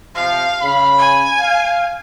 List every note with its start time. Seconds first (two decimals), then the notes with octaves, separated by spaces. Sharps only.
0.15 C3 F3 F5
0.62 C#3 B5
0.99 G#5
1.38 F5